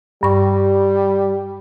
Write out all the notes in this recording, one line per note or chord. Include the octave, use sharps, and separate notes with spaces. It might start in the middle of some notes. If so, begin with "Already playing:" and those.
G2 G3 C#6